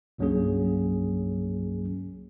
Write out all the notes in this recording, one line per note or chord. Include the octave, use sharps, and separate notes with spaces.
C2 G2 F#3 A#3 C#4 G#4